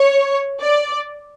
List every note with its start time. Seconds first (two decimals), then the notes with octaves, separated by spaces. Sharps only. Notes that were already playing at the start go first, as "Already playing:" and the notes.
Already playing: C#5
0.62 D5